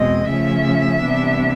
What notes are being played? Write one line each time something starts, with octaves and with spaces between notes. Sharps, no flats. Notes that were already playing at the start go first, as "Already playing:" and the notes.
Already playing: E2 B2 G#3 C4 D#5
C#3 F3 A3 C#4 E5
C3 E3 G3 B3 D4